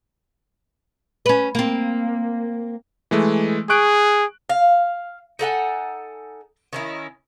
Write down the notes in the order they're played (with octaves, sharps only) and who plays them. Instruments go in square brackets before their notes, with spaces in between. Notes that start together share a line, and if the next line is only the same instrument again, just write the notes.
[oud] C#4 B4
A#3 C4
[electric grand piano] E3 G#3 A3
[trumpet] G#4 [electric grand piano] C#6 F#6 D7
[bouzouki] F5
D#4 A4 F#5 G#5
D#3 C#4 E4